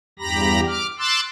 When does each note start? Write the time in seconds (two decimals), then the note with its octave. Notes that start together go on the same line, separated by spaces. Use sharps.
0.19 E2 G2 G4 A#5 B5 A#6
0.67 D6 F6
0.99 C6 D6 E6 F#6 A6